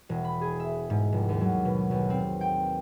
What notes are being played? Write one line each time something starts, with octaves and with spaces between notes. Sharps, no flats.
E1
B5
G#4
E5
G#2
F1
D#2
F#3
B2
B1
C4
G5